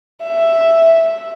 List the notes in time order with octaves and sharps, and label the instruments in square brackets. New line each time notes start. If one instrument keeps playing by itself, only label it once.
[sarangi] E5